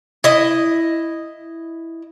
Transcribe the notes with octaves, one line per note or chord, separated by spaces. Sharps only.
E4 D#5